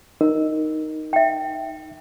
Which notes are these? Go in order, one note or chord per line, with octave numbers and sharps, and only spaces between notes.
D#4 A#4
E5 G5